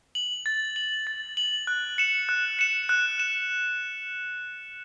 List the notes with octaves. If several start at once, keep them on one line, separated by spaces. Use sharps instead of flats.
F#7
A6
F#7
A6
F#7
F#6
C#7 E7
F#6
C#7 E7
F#6
E7